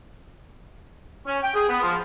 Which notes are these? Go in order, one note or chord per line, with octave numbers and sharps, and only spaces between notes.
C#4
G5
G#4
B3
F3